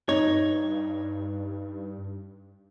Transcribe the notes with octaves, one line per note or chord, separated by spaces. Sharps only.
G2 D#4 C#5